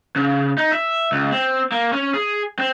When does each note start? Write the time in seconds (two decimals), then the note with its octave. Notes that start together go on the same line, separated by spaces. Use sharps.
0.16 C#3
0.57 D#4
0.72 E5
1.12 C#2
1.32 C4
1.72 A#3
1.93 C#4
2.14 G#4
2.59 C4